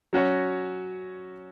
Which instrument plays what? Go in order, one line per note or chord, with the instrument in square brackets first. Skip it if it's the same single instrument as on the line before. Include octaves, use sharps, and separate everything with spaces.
[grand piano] F#3 C#4 F#4 C#5